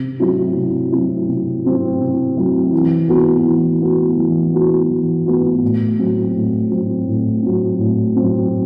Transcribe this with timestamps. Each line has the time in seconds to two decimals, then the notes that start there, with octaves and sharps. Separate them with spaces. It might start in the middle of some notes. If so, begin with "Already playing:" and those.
Already playing: C3
0.20 F#3 C4 E4
0.56 C3
0.92 F#3 C4 E4
1.28 C3
1.65 F#3 C4 E4
2.00 C3
2.37 F#3 C4 E4
2.73 E3
3.09 B3 F#4
3.45 E3
3.82 B3 F#4
4.17 E3
4.54 B3 F#4
4.90 E3
5.26 B3 F#4
5.62 A2
5.98 F#3 C4
6.35 A2
6.70 F#3 C4
7.07 A2
7.43 F#3 C4
7.79 A2
8.16 F#3 C4